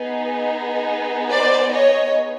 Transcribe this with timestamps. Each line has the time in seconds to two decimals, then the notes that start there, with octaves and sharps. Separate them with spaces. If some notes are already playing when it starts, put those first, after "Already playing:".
Already playing: B3 D#4 G#4
1.31 C5 D5
1.72 C#5 D#5